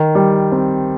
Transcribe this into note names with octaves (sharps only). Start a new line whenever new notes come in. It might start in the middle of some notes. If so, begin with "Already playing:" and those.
Already playing: D#3
G3
C4